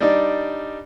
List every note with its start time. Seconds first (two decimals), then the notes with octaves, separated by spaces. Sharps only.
0.01 G3 D4 D#4